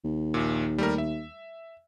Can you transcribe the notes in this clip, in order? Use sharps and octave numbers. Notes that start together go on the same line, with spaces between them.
D#2
A#1 A#2
G3 A3 A#4
E5